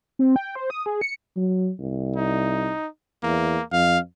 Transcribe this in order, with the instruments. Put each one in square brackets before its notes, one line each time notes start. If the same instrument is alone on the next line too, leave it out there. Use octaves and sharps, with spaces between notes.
[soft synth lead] C4
G5
C5
D#6
G#4
C#7
[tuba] F#3
C2
[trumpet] D#4
[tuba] E2 [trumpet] A#3
[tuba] F2 [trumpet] F5